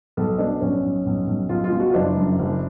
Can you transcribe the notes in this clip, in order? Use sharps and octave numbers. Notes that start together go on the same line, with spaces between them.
B1 A4
B2 D4
B1 C#4
B1
B1
B1
B1 F4
F4
B2
F#4
F4
F#1 D4
F#2
F#1